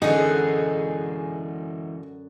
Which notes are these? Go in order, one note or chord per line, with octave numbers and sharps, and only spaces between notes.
F#2 D3 E3 D#4 F#4 G#4 F#5